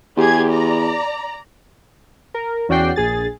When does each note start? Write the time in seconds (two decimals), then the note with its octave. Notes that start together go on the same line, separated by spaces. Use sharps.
0.17 E2 G4 G#4 G#6
0.50 D5 A#5
2.34 A#4
2.69 E2 C#4 F#4 D5 G5 C7
2.96 A#1 G#4 A6